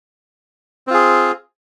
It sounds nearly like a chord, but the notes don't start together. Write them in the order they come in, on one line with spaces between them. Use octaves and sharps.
C4 F4 G#4